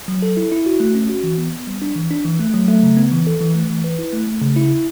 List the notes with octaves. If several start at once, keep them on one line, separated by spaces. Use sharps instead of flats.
F#3
A4
E4
E4
F#4
A3
C#4
F#4
E3
B3
B3
G3
D4
E3
D4
E3
A3
F#3
A3
C#3
B3
E3
A4
E3
A3
E3
B4
E4
A3
A3
C#3
E4